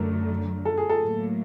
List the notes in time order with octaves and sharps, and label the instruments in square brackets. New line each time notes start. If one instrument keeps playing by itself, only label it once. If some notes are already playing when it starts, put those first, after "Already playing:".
Already playing: [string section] F#2 D3 F#3 A3 [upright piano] A4 A#4
[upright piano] A4
G#4
A4
[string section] A2 F#3 A#3